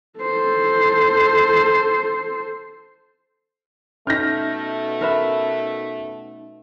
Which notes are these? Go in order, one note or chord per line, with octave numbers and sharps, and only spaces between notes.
A4 C5
B2 A3 C#4 D#4 F6 G6 A#6
A#4 B4 E5